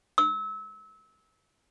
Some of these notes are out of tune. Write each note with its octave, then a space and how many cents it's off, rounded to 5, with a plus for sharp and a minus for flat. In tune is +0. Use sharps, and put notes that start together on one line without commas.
E6 -30